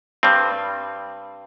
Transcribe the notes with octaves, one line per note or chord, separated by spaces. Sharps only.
G2 G3 C4